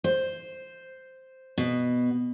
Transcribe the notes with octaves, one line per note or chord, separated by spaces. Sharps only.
C5
B2